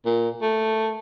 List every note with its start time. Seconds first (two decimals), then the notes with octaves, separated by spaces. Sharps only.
0.06 A#2
0.42 A3